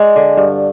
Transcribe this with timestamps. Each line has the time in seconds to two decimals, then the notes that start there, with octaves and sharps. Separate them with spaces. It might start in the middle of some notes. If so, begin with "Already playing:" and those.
Already playing: G#3 D5
0.16 D3
0.37 G2